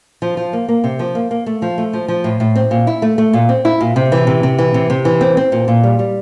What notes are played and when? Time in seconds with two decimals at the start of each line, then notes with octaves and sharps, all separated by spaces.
0.22 F3
0.37 F3
0.53 A#3
0.68 A#3
0.84 C3
0.99 F3
1.15 A#3
1.31 A#3
1.46 A3
1.62 F3
1.78 A3
1.93 F3
2.08 F3
2.24 A2
2.40 A2
2.56 C4
2.71 A#2
2.87 E4
3.02 A3
3.18 A3
3.33 A#2
3.49 C4
3.65 E4
3.81 A#2
3.96 C3
4.12 E3
4.27 C3
4.43 C3
4.59 E3
4.74 C3
4.90 C3
5.05 E3
5.21 C4
5.37 C4
5.52 A#2
5.68 A#2
5.84 G3
5.99 G3